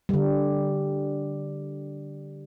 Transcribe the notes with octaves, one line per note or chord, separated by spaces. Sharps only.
D3 G3